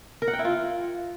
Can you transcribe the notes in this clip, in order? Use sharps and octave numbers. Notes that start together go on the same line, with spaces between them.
A#4
F#5
G5
E4
F4